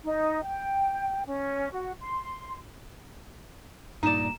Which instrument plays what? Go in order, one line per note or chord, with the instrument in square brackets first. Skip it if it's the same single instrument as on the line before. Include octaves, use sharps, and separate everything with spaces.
[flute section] D#4
G5
C#4
F#4
C6
[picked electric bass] G2 A#2 [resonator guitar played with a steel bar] D#4 D5 [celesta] A#5 E7